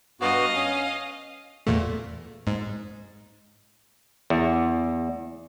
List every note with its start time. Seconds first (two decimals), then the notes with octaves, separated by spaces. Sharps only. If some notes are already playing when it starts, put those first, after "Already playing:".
0.21 G2 B3 F#4 D#5 F5
0.55 C#4
1.67 E2 A#2 A3
2.47 G#2
4.30 E2